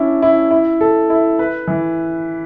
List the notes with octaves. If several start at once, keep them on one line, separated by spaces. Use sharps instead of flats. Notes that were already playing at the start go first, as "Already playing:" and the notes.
Already playing: C#4 D4 E4
E4
E4
A4
E4
B4
E3